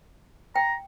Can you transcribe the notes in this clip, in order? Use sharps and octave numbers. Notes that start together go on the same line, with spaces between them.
G5 A#5